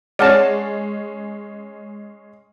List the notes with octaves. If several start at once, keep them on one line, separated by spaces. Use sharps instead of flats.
G#3 C#4 C#5 D5 F#5 A5 F6 A#6